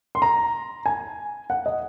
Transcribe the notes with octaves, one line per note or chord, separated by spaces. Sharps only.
C6
A#5
G#5
F#5
D#5